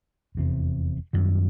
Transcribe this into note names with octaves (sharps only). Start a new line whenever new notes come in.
F1 E2 C3
F#2 D#3 G3